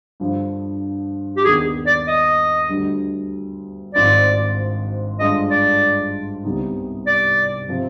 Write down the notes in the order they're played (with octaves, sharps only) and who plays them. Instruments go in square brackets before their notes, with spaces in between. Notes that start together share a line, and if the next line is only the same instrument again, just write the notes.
[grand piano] G2 D3 F3
[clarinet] G4
[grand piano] D#2 D#3 B3 D4 [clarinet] G#4
[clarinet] D5
D#5
[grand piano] D2 D3 G3
[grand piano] G#1 G#2 F3 C4 [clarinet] D5
[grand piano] G2 D3 G#3 D4 F4 [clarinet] D#5
[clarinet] D5
[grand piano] C2 C3 G3 B3 D#4
[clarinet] D5
[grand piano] C3 F3 C4